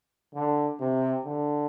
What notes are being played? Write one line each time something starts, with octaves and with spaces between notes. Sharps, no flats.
D3
C3
D3